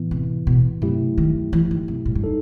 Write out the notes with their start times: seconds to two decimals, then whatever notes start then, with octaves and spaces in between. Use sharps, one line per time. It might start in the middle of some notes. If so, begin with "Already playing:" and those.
Already playing: A2 E3 B3 E4
0.11 C3
0.47 B2
0.82 G2 C3 F#3 A3 E4 G4
1.18 D#3
1.53 E3
1.71 D#3
1.88 C3
2.06 A2
2.15 G2
2.24 D#4 A4